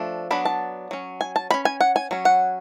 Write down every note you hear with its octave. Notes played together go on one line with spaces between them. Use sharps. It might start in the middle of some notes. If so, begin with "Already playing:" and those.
Already playing: F3 A3 D4
F#3 B3 D4 B5
A5
F#3 C#4
G#5
A5
F#3 C#4 B5
G#5
F#5
G#5
F#3 C#4
F#5